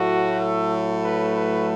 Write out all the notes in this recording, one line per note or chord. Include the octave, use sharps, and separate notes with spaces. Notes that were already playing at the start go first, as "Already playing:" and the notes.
Already playing: A2 F#3 A3 F#4
A4
B4
B4